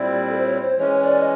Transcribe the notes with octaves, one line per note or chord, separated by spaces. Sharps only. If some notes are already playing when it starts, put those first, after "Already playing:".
Already playing: A#2 G3 C4 E4 D5
A4
C5
C#5
C5
E3 G#3 C#4 C#5
D5
D#5